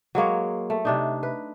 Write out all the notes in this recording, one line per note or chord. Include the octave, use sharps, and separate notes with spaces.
F#3 G#3 A#3 C#5
A3
C3 D4 D#4
B4